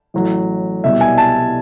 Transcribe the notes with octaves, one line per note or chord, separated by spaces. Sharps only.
A1 A2 F#3
C2 B2 G3 E5
G#5
A5